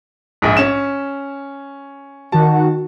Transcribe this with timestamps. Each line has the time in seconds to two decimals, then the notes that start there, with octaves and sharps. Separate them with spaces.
0.42 A#1 G#2
0.57 C#4 E7
2.32 D#3 F#4 A5